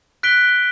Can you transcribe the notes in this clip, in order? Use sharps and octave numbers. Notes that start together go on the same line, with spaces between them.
F#6 B6 D7 G7